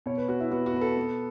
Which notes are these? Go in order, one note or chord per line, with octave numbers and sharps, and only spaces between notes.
B2 C#5
B4
B3 F#4
E4
B3 F#4
F#4
B2 B4
A4
B3